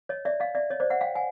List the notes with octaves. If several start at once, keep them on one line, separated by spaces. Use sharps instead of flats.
C#5 D#5
D5 E5
D#5 F5
D5 E5
C#5 D#5
C5 D5
E5 F#5
F5 G5
F#5 G#5